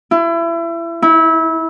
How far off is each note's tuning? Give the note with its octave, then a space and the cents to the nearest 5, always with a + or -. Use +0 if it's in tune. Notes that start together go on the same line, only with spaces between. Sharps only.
E4 +30
E4 -25